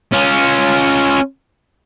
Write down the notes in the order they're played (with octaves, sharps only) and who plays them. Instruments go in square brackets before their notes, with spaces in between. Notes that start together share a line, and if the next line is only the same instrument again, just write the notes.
[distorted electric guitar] C#4 F4